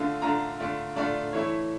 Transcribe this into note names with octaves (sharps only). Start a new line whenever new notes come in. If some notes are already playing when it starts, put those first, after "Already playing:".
Already playing: D3 A3 D4 F4
D3 A3 D4 F4 A#5
D3 A3 D4 F4
D3 A3 D4 F4 D5
E3 A3 E4 C#5